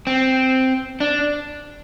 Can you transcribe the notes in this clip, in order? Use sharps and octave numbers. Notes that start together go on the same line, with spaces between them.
C4
D4